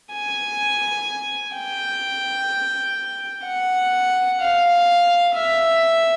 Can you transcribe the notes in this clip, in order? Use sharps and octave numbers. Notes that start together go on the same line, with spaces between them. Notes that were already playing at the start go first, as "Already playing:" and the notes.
G#5
G5
F#5
F5
E5